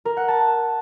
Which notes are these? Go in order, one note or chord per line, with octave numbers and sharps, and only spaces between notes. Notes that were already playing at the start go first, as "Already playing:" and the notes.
A#4
F#5
A5